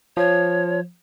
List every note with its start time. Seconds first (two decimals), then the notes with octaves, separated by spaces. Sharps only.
0.17 F3 C#5